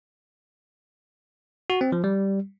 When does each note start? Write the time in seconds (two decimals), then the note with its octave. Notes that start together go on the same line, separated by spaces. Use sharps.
1.70 F#4
1.81 C4
1.92 F3
2.04 G3